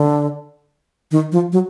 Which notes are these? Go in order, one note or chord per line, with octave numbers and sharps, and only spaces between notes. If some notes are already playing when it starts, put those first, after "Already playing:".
Already playing: D3
D#3
F3
F#3